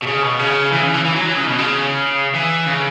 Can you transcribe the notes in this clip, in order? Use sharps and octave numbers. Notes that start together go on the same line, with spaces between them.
B2
C#3
B2
C#3
E3
C#3
E3
E3
F#3
E3
C#3
B2
C#3
E3
C#3